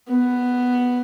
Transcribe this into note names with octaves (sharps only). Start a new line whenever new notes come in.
B3